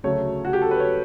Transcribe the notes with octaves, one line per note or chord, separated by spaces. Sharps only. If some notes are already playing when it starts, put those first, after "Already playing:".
D2 C#3 F#3 A3 C#5
F#4
G4
A4
B4
C#5